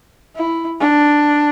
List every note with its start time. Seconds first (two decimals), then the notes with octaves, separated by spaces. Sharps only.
0.36 E4
0.80 D4